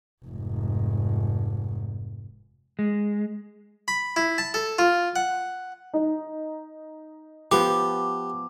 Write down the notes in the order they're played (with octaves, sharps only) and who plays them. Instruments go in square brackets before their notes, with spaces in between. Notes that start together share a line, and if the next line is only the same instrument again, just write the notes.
[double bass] F1 G#2
[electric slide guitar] G#3
[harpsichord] B5
E4
A5
A4
F4
F#5
[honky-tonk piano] D#4
[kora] F3 B3 [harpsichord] G4 [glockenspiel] D6